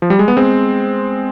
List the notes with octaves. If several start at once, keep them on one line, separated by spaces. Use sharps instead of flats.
F3
G3
G#3
B3
G#3 C4